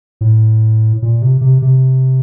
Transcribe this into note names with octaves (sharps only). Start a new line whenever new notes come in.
A2
A#2
C3
C3
C3